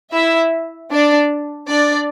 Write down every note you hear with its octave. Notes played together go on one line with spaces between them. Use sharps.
E4 E5
D4 D5
D4 D5